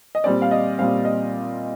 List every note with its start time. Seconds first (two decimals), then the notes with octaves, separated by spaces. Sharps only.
0.15 D#5
0.24 A#2 G3 C4 D5
0.42 F5
0.51 D#5
0.78 A#2 G3 C4 F5
1.05 D#5